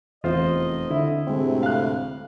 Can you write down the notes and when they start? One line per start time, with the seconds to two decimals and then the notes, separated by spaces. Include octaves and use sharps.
0.24 F1 E2 F4 C5 D#5
0.91 D3 E4
1.27 D2 A2 C3 G#3 C4
1.63 F5 F#6